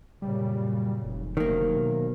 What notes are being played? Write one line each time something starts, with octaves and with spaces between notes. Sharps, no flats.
F#2 A#2 C#3 G3
F1
C3 D#3 F#3 A#3
B2